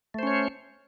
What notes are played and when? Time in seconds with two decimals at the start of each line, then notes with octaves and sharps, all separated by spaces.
0.14 A3
0.19 C5
0.23 C#4
0.27 C#5